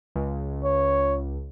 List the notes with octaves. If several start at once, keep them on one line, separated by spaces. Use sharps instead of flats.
C#2
C#5